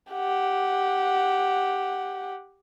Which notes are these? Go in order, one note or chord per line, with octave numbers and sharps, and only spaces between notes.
G4 F#5